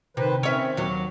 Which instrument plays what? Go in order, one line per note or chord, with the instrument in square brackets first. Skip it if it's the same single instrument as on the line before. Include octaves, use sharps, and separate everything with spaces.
[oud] C3 [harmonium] D#3 B4 C5
[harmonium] D#3 C4 [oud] C#4 E5
[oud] D#2 F#3